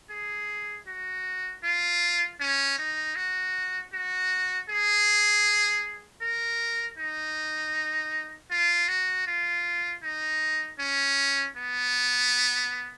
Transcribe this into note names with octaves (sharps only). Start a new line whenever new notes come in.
G#4
F#4
F4
C#4
D#4
F#4
F#4
G#4
A#4
D#4
F4
F#4
F4
D#4
C#4
B3